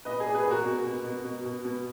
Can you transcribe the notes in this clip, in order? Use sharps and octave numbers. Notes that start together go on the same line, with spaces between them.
A#2 B4 D#5
G#4
A#2
G#4 B4
A#2
F#4 A#4
B2
B2
B2
B2
B2
B2